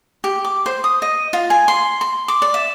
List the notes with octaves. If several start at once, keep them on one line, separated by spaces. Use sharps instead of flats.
G4
D6
C5
D#6
D#5
F4
G#5
C6
C6
D6
D5
E5